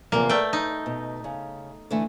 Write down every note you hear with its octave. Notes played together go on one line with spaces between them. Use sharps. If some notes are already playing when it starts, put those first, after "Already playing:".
E2 C3 F3 A#3
A3 B4 D5 G5
D#4
B2
C#3
D3 E3 A3